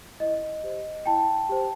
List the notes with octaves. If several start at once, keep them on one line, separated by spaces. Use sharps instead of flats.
E4 D#5
G4 C5
E4 G5 A5
G4 C5